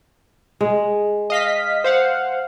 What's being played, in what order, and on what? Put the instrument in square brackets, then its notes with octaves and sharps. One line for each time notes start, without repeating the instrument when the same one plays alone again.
[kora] G#3
[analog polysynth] D#5 F5 B6
C5 F5 F#5